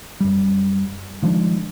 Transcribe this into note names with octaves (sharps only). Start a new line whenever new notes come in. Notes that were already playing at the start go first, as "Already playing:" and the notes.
F#2 G3
D#3 F3 G#3 D4